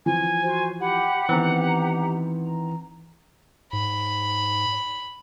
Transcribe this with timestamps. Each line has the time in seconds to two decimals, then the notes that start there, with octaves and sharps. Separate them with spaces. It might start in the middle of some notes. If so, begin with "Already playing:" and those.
0.06 E3 F3 G#5
0.43 F#4 C5
0.80 G4 F#5 B5
1.29 D#3 E3 B3 C4 G4 A#5
2.41 A#5
3.73 G#2 B5